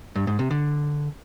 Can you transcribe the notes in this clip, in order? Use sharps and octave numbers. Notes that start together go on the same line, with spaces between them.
G2
G#2
C3
D3